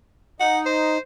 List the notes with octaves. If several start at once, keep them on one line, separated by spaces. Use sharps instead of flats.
D#4 F#5
C5